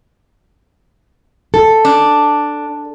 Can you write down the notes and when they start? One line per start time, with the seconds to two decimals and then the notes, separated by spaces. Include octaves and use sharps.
1.54 A4
1.85 D4